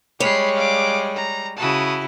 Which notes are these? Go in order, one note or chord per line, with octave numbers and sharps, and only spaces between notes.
G3 G#3 C#5 B5 C7
F5 D6
A#5
C#3 E4 F#4 A5 D#6